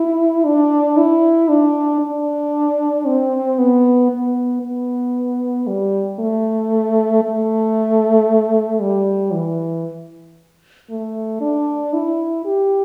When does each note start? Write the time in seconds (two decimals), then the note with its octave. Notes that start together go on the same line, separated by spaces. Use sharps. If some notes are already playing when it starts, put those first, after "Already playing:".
Already playing: E4
0.45 D4
0.97 E4
1.49 D4
2.01 D4
3.06 C4
3.59 B3
4.11 B3
4.63 B3
5.67 G3
6.20 A3
7.24 A3
8.81 G3
9.33 E3
10.90 A3
11.41 D4
11.94 E4
12.46 G4